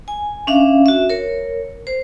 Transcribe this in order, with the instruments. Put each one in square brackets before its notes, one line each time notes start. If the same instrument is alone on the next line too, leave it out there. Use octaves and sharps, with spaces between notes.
[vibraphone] G#5
C#4 D4 E5 F5
F#4 E5
A#4 C#5
C5